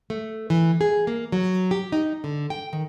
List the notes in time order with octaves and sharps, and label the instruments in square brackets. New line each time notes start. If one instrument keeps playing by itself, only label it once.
[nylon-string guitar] A3
E3
G#4
A#3
F#3
G4
D#4
D3
G5
D#3